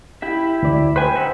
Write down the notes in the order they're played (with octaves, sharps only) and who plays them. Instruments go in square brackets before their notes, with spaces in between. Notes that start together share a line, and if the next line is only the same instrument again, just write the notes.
[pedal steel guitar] E4 G4 E5
[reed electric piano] D2 D5
[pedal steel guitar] B4 G#5 [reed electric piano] C5 G5
[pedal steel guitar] D#4 E5 F#5